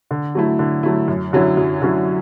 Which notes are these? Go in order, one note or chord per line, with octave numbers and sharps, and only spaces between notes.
D3
F#3 A3 E4
D3
F#3 A3 E4
F#2
D3 F#3 C#4 E4
F#2
D3 F#3 C#4 E4